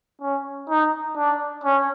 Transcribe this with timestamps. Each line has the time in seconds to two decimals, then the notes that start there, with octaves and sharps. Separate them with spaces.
0.21 C#4
0.70 D#4
1.17 D4
1.64 C#4